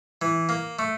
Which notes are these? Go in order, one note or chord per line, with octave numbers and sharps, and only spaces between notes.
E3
A#3
A3